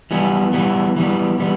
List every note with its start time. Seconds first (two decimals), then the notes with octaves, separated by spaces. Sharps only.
0.11 E3 G3 B3
0.53 E3 G3 B3
0.96 E3 G3 B3
1.39 E3 G3 B3